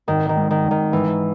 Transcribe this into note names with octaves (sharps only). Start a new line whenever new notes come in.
G#1 D#3
D#3
G#2
D#3
G#1
D#3
G#2 E3